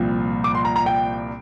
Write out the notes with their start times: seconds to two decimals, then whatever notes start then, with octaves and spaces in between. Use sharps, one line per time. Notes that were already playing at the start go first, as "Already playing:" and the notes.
Already playing: C2 A#2 F3
0.44 D6
0.55 C6
0.65 A#5
0.76 A#5
0.86 G5